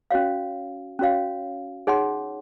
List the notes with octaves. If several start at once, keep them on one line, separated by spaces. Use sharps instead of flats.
C#4 F#4 C#5 F5
C#4 F#4 C#5 F5
D#4 G#4 C#5 F#5 C6